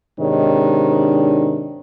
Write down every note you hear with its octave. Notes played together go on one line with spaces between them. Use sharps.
G#2 C3 D#3 D4 C#5